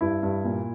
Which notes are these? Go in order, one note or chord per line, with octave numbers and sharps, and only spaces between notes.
G2 E4
G2
A#2